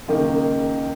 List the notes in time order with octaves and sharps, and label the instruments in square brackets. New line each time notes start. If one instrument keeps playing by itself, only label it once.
[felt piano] C#2 D#3 A#3